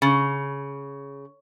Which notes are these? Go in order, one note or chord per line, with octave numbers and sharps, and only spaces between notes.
C#3